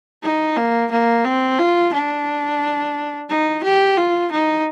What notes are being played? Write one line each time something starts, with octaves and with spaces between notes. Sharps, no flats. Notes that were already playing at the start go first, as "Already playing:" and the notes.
D#4
A#3
A#3
C4
F4
D4
D#4
G4
F4
D#4